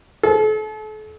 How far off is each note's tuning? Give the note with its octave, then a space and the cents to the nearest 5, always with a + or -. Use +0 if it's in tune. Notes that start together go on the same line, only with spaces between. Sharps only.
A4 -40